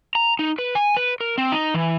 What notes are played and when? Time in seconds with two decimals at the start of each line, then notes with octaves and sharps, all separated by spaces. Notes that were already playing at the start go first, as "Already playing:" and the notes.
0.15 A#5
0.39 D#4
0.59 B4
0.75 G#5
0.97 B4
1.21 A#4
1.38 C4
1.52 D#4
1.74 E3